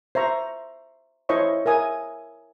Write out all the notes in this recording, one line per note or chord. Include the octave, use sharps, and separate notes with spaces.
C5 E5 A#5 C#6
E4 C5 C#5 D#5 E5 C#6
A#4 E5 G#5 D#6